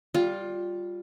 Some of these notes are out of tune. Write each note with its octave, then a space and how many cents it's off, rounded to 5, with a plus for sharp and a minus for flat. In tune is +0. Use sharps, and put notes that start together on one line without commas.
G3 +0 F4 +15